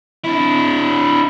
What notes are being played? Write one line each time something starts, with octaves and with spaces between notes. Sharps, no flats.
D4 E4